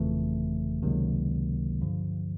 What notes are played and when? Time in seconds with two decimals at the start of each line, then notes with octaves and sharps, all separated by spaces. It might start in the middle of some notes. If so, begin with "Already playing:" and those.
Already playing: G1 F2 C#3 E3 A3
0.83 C#2 C3 D#3 F#3 A#3
1.81 G2 D3 F3